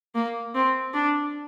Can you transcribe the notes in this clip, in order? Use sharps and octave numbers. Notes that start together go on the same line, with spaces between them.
A#3
C4
D4